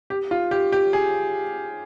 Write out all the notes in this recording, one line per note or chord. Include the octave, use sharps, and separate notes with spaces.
G4
F4
G4
G4
G#4